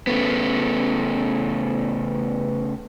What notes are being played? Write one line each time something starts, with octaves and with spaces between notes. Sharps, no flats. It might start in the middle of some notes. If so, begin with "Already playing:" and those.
C#3 A3 B3